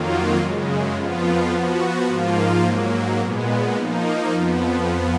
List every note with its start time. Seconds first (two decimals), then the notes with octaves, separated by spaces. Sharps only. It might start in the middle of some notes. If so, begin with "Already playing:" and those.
Already playing: F2 D#3 F#3 A#3 F4
0.38 F#2 C#3 G#3
0.93 F2 F3 B3 F4
1.50 F3 B3 F#4
2.06 G#2 F3 A#3 F4
2.63 G#2 F#3 A#3
3.19 A#2 G#3 B3
3.75 F3 A#3 D#4
4.32 F2 F3 B3